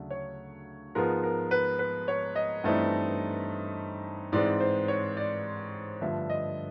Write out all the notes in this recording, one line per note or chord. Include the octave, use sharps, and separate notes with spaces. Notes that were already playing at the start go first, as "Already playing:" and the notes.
Already playing: D2 C#3 F#3 A3 D4
C#5
G#2 F3 G#3 B3 A#4
A#4
B4
B4
C#5
D#5
G2 E3 A3 C4 D#4
G#2 E3 G#3 C4 D5
C5
C#5
D5
G2 D3 F3 A3 E5
D#5